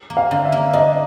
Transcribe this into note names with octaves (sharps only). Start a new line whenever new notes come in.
A#3
F5
D3
E5
A#3
D4 D#5